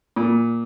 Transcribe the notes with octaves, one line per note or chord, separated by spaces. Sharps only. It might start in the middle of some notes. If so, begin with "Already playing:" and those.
A#2